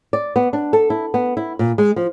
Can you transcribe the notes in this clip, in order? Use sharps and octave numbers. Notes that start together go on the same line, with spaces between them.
D5
B3
D4
A4
E4
B3
E4
A#2
G#3
F3